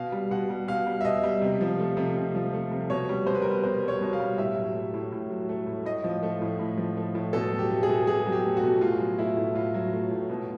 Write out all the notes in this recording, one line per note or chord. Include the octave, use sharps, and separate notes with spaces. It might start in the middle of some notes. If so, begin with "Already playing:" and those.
Already playing: B2 F5
G3
B2 F#5
G3
B2 F5
G3
E5
B2 D#5
G3
C3
F3
A3
C3
C3
F3
A3
C3
B2 C#5
G3
B2 C5
B4
A#4
G3
B4
B2 C5
G3
C#5
B2
F5
G3
A2 E5
F#3
A3
A2
A2
F#3
A3
A2
A2 D#5
F3
A3
A2
A2
F3
A3
A2
B2 A4
F#3
G4
A3
G#4
B2
B2 G#4
F#3
G4
A3
F#4
B2
A2 F4
F#3
A3 E4
A2
A2 F4
F#3
A3
A2
B2